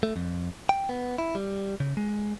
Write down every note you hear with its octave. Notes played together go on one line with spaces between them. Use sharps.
A3
F2
G5
B3
E4
G3
C#3
G#3